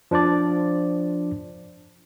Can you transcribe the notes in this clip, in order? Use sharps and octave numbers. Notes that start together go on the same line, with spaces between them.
F3 D4 C5 D5